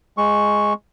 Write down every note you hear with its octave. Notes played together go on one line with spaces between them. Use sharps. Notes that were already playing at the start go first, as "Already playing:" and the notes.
G#3 C#6